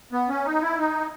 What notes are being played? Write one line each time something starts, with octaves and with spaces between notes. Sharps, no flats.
B3
C#4
D#4
E4
D#4